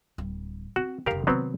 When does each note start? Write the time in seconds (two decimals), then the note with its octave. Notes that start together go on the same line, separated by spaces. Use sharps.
0.18 D1 G3
0.76 C4 F#4
1.06 F1 D3 G4 A#4 F5
1.27 C3 D#3 F#3 B3 C4